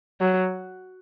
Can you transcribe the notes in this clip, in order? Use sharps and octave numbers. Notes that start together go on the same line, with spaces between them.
F#3